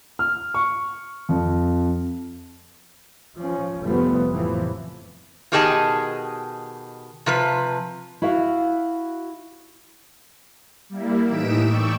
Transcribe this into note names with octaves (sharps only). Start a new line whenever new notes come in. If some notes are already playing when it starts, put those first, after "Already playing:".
F6
C#6
F2
F3 C#4
F1 F3 G3 A3 B3
A2 C3 E3 F3
B2 D#3 G4 G#4 D#5 A5
C3 F3 B4
E4 F#4 E5 F5
G3 A#3 E4
A2 E3 D#4 B6 D7 E7
D5 G5 C#6 E6